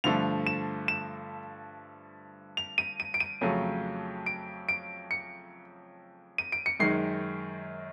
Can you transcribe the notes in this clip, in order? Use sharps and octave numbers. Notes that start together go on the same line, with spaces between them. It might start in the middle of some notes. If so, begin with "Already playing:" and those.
G2 D3 F3 A3 F7
E7
E7
F7
D#7
D#7
D7
D#7
F2 C#3 F#3 A3
D7
D7
C#7
D#7
D7
C#7
F#2 D#3 G#3 C7